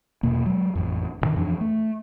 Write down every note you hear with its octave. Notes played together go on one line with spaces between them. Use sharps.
E2 B2 A#3
F#3 G#3
A1 F2
D2 G#2 D#3
F2 E3 F3 D4
A3